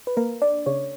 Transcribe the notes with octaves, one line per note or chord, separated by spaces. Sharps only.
B4
A#3 A#4
D4 D5
C#3 C#5